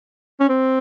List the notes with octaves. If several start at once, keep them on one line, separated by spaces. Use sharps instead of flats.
C#4
C4